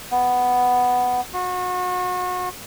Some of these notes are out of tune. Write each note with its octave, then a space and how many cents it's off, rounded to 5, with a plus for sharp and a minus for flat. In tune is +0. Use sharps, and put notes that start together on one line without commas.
B3 +5
F#4 -35